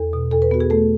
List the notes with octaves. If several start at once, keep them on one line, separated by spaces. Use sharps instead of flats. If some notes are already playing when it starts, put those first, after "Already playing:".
Already playing: E2 A4
B2
E2 A4
B4
B3 F#4
G#4
A3 A4